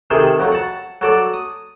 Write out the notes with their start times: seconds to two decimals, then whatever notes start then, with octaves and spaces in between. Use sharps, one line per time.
0.10 C3 D#3 G#4 A4 C6
0.40 F2 F#3
0.52 F#5 A5
1.01 F#3 A4 D5
1.34 D#6